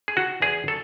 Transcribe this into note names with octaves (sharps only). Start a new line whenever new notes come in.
G#4
D#3 F#4
E2 G#4
F#3 A4